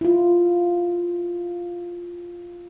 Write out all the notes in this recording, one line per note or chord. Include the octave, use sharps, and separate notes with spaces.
E4 F4